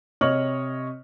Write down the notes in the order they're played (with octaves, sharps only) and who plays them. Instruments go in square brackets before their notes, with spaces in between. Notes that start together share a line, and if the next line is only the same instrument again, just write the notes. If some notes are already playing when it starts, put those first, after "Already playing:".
[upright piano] C3 C#5 D#5 C#6 F6 F#7